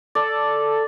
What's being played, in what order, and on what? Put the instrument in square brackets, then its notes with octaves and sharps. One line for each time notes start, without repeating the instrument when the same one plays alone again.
[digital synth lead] A4 [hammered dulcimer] D5